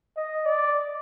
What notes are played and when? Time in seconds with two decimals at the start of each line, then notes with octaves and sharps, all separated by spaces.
0.17 D#5
0.46 D5